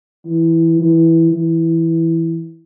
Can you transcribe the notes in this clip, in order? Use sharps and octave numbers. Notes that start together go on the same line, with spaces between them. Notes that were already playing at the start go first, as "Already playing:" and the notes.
E3
E3
E3